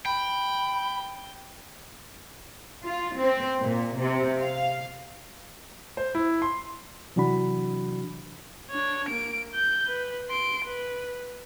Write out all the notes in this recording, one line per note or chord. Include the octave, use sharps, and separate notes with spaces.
G5 B5
F4
C4
A#2
C3
F5
C5
E4
C6
C3 E3 F#3 D4 F#4 B5
D4 C#5
A#3 D7
G6
B4
C6 D7
B4